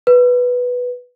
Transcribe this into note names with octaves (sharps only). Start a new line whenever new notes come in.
B4